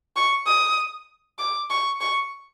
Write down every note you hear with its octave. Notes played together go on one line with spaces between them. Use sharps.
C#6
D#6
D6
C#6
C#6